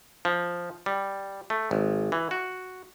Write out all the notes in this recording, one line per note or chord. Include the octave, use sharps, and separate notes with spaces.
F3
G3
A3
G#1
E3
F#4